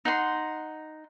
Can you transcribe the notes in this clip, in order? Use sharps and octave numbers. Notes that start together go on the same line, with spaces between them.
D#4 F#5 C6